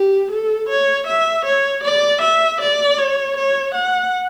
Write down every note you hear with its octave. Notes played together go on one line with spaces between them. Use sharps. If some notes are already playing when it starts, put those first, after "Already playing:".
Already playing: G4
A4
C#5
E5
C#5
D5
E5
D5
C#5
C#5
F#5